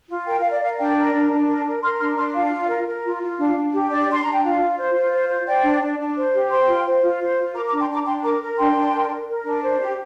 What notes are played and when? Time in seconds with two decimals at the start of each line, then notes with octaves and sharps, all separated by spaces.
0.09 F4
0.27 A#4 G5
0.40 A#4 F5
0.51 D5
0.62 A#4 F5
0.79 D4 D5 G5
0.97 A#4
1.14 D4
1.32 D4
1.48 A#4
1.66 A#4
1.83 A#4 C6 F6
2.00 D4 C6 F6
2.18 D4 C6 F6
2.35 F4 F5
2.52 F4
2.70 A#4
2.87 A#4
3.05 F4
3.22 F4
3.39 D4 F5
3.56 D4
3.73 G4
3.91 D4 D5
4.08 D4 C6
4.22 D4 A#5
4.33 G5
4.43 F4 F5
4.60 F4
4.78 C5
4.94 F4
5.12 C5
5.29 C5
5.47 C5 D5 G5
5.64 D4
5.81 D4
5.99 D4
6.16 C5
6.34 G4
6.51 C5 G5 C6
6.68 F4
6.86 C5
7.03 F4
7.21 C5
7.37 F4
7.54 A#4 A#5 D6
7.68 A#5 D6
7.72 D4
7.81 G5 C6
7.89 D4 A#5 D6
8.06 D4 G5 C6
8.23 A#4 A#5 D6
8.42 A#4
8.58 D4 G5 C6
8.76 D4
8.93 A#4
9.10 A#4
9.28 A#4
9.44 D4
9.62 C5
9.80 G4